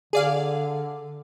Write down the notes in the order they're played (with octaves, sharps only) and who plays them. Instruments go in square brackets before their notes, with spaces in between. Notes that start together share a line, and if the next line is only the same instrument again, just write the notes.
[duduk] D3 [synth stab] G#4 D5 F5